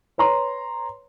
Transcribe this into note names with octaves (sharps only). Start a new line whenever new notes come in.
B4 C#5 A#5 C6